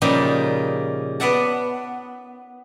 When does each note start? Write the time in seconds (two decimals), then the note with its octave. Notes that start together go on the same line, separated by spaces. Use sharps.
0.02 A#2 C#3 F3 G3 D#4
1.20 B3 D5 E5 F#5 A5